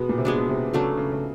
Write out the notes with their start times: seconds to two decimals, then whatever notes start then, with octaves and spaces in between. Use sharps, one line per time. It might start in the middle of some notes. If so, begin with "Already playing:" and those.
Already playing: B2 G#3 B3
0.09 A#2
0.18 C3
0.25 B2 G#3 B3 D4
0.38 B2
0.49 C3
0.73 C#3 F#3 A3 D4
0.97 C#3
1.12 C#3